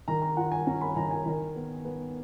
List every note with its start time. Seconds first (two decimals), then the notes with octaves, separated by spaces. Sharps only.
0.08 D#3 A#5
0.22 A#5
0.37 F4 F#5
0.52 G#5
0.67 C#4 A#5
0.81 B5
0.96 D#3 A#5
1.11 G#5
1.26 D#3
1.56 B3
1.85 B3